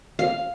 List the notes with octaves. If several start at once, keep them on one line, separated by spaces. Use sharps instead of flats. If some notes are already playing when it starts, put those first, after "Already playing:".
F5